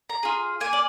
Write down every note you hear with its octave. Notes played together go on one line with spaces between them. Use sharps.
A#5
F4 G#4
A#3 G#5
D5